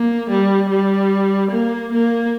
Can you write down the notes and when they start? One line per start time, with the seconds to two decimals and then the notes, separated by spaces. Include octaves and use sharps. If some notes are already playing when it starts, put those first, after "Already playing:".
Already playing: A#3
0.30 G3
0.70 G3
1.51 A#3
1.92 A#3